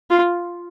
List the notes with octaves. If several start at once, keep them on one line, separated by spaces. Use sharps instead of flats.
F4